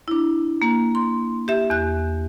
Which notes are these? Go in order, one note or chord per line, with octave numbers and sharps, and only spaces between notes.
D4 E4
A#3
C6
G4 E5
E2 F#6